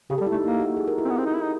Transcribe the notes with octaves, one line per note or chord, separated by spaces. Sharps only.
C#3 G4
A4
G3
E4
A3
D#4
A#3 E4
F#4
G#4
A#4
E4
C4
B3
C4
D#4
E4
D#4